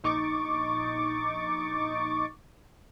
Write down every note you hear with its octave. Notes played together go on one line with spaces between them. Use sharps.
A#1 D#4 C#6 D6 A6